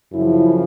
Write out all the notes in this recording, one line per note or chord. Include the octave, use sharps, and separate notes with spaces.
F#2 C#3 F3 E4